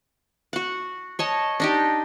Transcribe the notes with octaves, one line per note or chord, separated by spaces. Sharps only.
F#4 F#5
C#5 D#5 A5
D4 D#4 G4